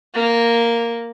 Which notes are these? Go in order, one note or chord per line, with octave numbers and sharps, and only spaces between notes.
A#3